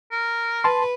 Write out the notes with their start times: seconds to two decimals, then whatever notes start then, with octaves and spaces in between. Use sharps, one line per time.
0.11 A#4
0.64 B4 A5 C6